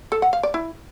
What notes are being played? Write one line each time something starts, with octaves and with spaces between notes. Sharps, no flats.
A4
F#5
F5
D5
E4